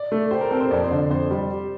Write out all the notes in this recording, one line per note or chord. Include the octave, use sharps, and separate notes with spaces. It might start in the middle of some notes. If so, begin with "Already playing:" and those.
Already playing: D5
A3
G4 C5
A#4
C4 A4
C5
F2 D5
C5
D3
F2 C5
G3